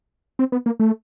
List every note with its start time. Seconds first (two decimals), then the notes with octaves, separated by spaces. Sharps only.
0.39 C4
0.52 B3
0.66 A#3
0.80 A3